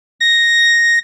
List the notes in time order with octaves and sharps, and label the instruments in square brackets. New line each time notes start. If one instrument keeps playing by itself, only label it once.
[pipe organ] A#6